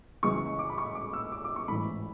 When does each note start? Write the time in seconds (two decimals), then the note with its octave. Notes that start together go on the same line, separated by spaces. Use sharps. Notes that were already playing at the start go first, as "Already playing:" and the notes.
0.23 C#2 C#3 E3 C#6
0.59 D6
0.70 B5
0.78 C#6
0.95 D6
1.13 E6
1.32 D6
1.44 D6
1.56 C#6
1.68 A1 G#2 E3 B5